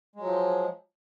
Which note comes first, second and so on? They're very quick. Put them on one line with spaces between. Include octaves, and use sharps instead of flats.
G#3 F#3 F3